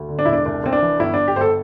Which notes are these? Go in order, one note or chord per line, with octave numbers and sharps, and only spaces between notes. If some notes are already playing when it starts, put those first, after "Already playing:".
Already playing: D2
D3
D4
E1 E4
D4
C2 D4
C2 C4
D4
E3
G1 E4
G1 D4
G4
G1 A4 C5